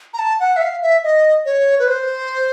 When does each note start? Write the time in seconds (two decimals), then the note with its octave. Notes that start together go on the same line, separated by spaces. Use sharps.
0.14 A#5
0.19 A5
0.40 F#5
0.56 E5
0.62 F5
0.82 E5
1.04 D#5
1.45 C#5
1.79 B4
1.88 C5